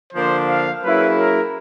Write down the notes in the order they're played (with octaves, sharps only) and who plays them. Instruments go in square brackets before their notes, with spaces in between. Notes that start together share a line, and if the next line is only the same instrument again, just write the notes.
[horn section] D3 F3 A#3 D4 [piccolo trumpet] C5
[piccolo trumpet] F5
[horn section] F#3 A#3 C#4 E4 G#4 [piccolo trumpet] B4
[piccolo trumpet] A#4